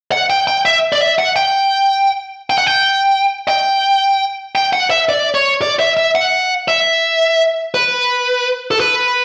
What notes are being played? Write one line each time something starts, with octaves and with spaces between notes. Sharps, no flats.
F#5
G5
G5
E5
D5
E5
F#5
G5
G5
F#5
G5
G5
G5
F#5
E5
D5
C#5
D5
E5
E5
F#5
E5
B4
A4
B4